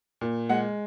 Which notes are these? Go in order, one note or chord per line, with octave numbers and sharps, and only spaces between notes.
A#2
G#3 F#5